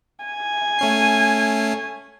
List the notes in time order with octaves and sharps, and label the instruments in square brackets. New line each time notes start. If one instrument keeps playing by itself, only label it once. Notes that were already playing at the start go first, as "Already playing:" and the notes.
[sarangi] G#5
[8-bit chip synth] A3 C#4 C7